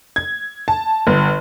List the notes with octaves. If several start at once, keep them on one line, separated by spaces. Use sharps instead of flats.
G#6
A5
G1